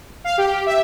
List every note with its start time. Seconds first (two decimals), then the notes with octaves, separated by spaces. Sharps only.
0.24 F5
0.38 G4
0.66 E5